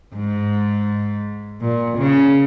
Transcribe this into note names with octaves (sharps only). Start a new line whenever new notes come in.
G#2
A#2
C#3